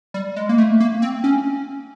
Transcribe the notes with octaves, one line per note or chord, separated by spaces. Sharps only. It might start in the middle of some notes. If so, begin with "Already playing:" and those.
G3
G#3
A#3
A3
A#3
C4
C#4